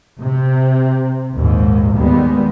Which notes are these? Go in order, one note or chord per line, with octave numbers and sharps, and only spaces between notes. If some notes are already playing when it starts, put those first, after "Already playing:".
C3
A#1 D#2 G#2
D#2 G3 G#3 B3